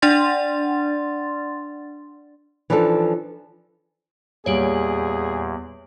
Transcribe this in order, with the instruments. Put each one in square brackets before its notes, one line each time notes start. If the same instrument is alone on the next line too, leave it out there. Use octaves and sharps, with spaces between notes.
[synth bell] D4 D5 F#5 C6 A6
[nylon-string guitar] E3 F3 D4 D#4 G#4 A4
[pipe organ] E2 [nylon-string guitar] A#2 G3 [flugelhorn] G#4 [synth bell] C#5 D7 F#7